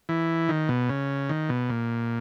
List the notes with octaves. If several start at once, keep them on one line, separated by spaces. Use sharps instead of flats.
E3
D#3
B2
C#3
D#3
B2
A#2